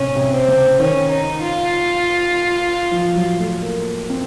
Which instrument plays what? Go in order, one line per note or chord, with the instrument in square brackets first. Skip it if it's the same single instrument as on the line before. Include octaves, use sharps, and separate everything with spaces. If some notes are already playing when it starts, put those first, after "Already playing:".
Already playing: [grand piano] A2 C3 [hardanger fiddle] C#4
[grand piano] C3
[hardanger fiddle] C4
[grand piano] C#3
[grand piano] D#3 [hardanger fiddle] C#4
[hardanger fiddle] D#4
F4
[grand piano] F3
F#3
A3
A#3
C4